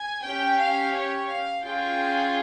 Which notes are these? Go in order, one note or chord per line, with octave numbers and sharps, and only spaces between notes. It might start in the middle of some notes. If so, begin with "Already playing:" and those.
Already playing: G#5
C#4 G4 G5
F5
C#5
F5
C#4 F4 G#4 G5